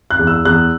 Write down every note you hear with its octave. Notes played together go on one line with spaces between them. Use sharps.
F#6
E2
E6
E2 F#6